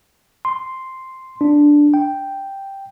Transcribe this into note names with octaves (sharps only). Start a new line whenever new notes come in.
C6
D4
G5